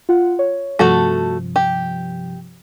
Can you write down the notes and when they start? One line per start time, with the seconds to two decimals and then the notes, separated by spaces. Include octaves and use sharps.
0.09 F4 F#5
0.39 C#5
0.79 G2 C3 F3 A3 F#4 A4
1.56 G4